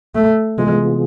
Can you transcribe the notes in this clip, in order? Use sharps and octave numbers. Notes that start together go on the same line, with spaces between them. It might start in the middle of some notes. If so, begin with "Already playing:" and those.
A3
C3 E3 G#3 B3 F4 G#4